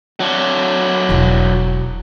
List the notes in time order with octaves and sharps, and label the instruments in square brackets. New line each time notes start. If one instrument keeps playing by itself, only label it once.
[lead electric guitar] F#3 D4
[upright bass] E1 E4